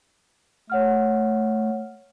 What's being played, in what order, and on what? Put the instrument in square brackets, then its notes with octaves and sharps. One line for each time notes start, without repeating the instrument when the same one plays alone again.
[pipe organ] A3 [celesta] C#5 F#5 F6